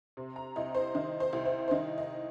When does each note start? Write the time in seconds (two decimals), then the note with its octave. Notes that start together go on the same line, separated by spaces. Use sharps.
0.17 C3
0.36 A#5
0.56 C2 D#5
0.75 C5
0.95 D#3 D#5
1.20 C5
1.33 C2
1.45 C5
1.68 C5
1.71 D#3 D#5
1.98 D#5